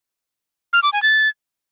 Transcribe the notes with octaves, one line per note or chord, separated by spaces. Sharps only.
F6
D6
G#5
A6